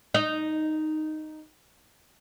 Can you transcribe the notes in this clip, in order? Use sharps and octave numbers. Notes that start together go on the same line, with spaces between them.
D#4 D#5